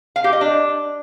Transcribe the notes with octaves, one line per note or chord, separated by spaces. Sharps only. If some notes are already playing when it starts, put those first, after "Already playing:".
F5
G4
D#5
D4